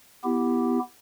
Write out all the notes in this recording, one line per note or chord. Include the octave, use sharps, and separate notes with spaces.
B3 E4 G4